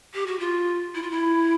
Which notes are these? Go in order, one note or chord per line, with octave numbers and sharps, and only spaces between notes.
G4
F#4
F4
E4
F4
E4